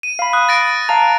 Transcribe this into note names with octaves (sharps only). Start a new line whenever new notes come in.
D#7
F5 B5
D#6 F#6
A6 A#6 D7
F5 A5 A#5 A6